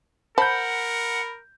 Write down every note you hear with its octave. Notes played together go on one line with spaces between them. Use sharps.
A#4 C5 F#5 A5 B5 G6